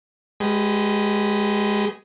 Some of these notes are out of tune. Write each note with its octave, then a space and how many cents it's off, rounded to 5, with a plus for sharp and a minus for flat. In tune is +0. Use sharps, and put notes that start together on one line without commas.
G#3 +0 G4 -25 B4 +0